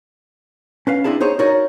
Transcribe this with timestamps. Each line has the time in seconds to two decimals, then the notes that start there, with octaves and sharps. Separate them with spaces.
0.87 C#4 B4 F5
1.04 C4 D4 E4 G#4 A5
1.20 D#4 G#4 C5 C#5
1.39 D#4 F#4 A#4 C#5 D5